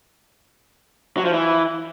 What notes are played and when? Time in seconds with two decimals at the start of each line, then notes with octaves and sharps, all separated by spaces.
1.17 F#3
1.25 F3
1.33 E3